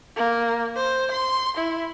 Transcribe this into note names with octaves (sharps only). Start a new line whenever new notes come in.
A#3
C5
C6
E4